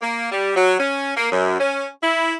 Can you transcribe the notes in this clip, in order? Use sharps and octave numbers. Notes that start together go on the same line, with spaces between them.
A#3
G3
F#3
C#4
A#3
F#2
C#4
E4